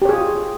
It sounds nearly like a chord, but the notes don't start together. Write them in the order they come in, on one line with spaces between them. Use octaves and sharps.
G4 C#5 G#4 F4